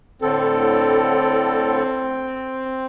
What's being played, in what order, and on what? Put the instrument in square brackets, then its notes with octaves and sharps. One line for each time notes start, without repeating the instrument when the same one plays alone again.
[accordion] A2 D3 A4 [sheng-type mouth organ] C4